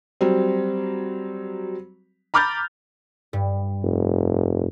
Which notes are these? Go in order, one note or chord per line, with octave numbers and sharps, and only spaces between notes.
F#3 G3 C4
A#5 B5 D6 F6 G6 A6
G2
F1